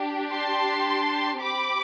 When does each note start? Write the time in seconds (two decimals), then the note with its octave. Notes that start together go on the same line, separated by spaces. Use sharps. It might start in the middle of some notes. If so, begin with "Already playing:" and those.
Already playing: D4 G4
0.33 A5 C6
1.41 C4 G4 B5 D6